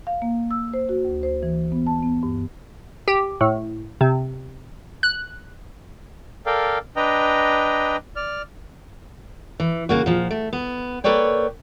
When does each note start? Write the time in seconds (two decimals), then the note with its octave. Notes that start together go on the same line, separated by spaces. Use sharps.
0.07 F5
0.22 A#3
0.51 E6
0.73 C5
0.89 F#4
1.05 D2
1.23 C5
1.43 E3
1.72 B3
1.87 A5
2.03 B3
2.23 G2
3.08 G4
3.41 A2
4.01 C3
5.03 F#6
6.46 A4 A#4 D5 F5 G5
6.96 D4 B4 D#5 G5 A#5
8.16 D5 F6
9.60 E3
9.89 C#3 A#3 F#4
10.06 A#2 F3
10.31 A3
10.53 B3
11.04 A#3 A4 B4 C#5 D5 G5